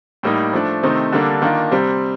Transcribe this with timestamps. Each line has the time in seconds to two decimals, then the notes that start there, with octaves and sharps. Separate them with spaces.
0.23 A2 G3 A#3 D#4
0.53 F3 A3 D4
0.83 C3 D#3 A3 C4 D#4
1.12 D3 G3 A#3 D4 A4
1.42 D#3 A#3 D4 F4
1.71 C3 G3 C4